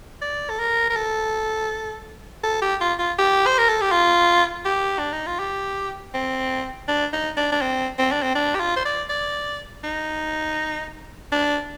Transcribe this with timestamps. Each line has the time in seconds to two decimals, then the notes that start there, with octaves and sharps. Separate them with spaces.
0.22 D5
0.50 A4
0.59 A#4
0.90 A#4
0.96 A4
2.44 A4
2.62 G4
2.81 F4
2.99 F4
3.19 G4
3.47 C5
3.58 A#4
3.69 A4
3.81 G4
3.92 F4
4.65 G4
4.99 D4
5.12 D#4
5.27 F4
5.39 G4
6.14 C4
6.88 D4
7.13 D#4
7.37 D4
7.52 D4
7.61 C4
7.99 C4
8.12 D4
8.23 C4
8.35 D4
8.55 G4
8.60 F4
8.76 C5
8.86 D5
9.10 D5
9.84 D#4
11.32 D4